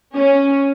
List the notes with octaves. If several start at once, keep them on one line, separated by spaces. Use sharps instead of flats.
C#4